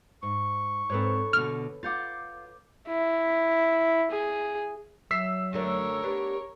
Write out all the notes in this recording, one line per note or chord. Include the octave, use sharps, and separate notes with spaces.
G#2 C#6
G#2 C4 A4 B4 C#5
B2 D3 F6
F4 F5 F#5 D6 G6 A6
E4
G#4
F#3 E5 E6 B6 C7
F#2 D3 A3 A#4 C#5
B3 D4 G4